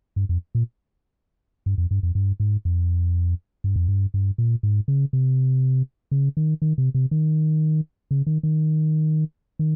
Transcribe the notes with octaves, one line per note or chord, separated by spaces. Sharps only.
G2
F2
A#2
G2
F2
G2
F2
G2
G#2
F2
G2
F2
G2
G2
A#2
G#2
C#3
C3
C#3
D#3
D#3
C3
C3
D#3
C#3
D#3
D#3
D#3